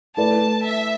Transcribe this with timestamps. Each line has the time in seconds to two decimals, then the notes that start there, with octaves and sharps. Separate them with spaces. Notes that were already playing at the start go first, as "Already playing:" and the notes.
0.17 A3 E4 B4 D5 A5
0.65 E5